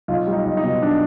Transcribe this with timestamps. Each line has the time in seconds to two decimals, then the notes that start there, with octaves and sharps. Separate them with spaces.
0.08 B1 F4
0.27 G3
0.32 D#4
0.45 B1
0.57 D#4
0.64 B2
0.82 D4